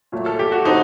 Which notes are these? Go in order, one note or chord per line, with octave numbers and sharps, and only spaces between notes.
A#2 F#3 A3
A4
G4
F#4
D3 A3 C4 D#4